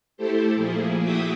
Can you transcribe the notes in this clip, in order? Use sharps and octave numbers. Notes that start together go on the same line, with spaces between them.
A3 E4 G4 A4 C5
A#2 F3 A#3 E4 G#4
F#4 G#4 E5 G5 D6 D#6